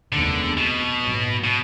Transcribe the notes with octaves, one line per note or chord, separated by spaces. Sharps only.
F1 D#2 D3 D#3 G#3 B3
B2
A#1 G#2 F#3 B3
B2